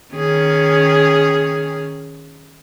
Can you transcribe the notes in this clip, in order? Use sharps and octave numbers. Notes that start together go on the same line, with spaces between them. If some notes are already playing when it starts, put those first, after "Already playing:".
D#3 C#4 G#4